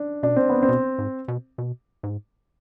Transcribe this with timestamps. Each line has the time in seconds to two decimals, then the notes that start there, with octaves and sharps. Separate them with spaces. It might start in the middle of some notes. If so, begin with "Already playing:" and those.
Already playing: D4
0.23 B2 D4
0.36 C4
0.50 B3
0.63 C4
0.69 B2
0.98 G#2
1.28 B2
1.58 B2
2.03 G#2